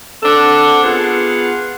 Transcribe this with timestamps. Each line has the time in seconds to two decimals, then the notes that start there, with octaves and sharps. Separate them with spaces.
0.23 C4 D4 A4 F#5
0.83 B3 F4 G#4 F#5